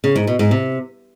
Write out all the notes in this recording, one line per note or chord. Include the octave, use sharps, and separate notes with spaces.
C#3
G#2
B2
G#2
C3